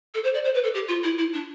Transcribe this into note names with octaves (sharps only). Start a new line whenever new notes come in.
A4
C5
D5
C5
B4
A4
G4
F4
E4
E4
D4